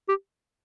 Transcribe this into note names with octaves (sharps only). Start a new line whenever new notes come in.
G4